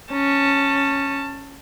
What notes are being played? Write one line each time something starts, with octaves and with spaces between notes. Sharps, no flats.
C#4 A5